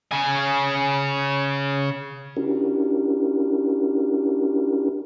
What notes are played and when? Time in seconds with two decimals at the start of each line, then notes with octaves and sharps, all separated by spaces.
0.12 C#3 G#5
2.37 C#4 D4 E4 F#4 G4 A#4